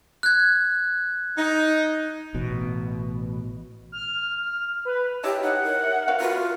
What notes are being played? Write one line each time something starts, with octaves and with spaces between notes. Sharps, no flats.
F#6 G#6
D#4
A1 B2
F6
B4
E4 G4 C#5 D#5 A5
D#4 F#5
A#4
E5
B3 F#4 F5
F4 F#4 A#4 B4